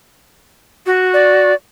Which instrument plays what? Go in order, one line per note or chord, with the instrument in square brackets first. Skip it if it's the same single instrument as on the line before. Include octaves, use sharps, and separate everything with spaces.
[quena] F#4
[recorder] D5